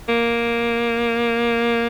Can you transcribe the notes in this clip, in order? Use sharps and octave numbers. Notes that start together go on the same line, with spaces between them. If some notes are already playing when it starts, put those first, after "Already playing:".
A#3